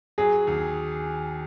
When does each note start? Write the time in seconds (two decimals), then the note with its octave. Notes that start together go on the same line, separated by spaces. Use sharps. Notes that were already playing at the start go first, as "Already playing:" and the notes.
0.18 F#3 G#4
0.47 D#2